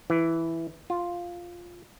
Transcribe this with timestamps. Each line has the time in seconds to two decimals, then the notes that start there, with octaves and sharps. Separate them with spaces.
0.10 E3
0.90 F4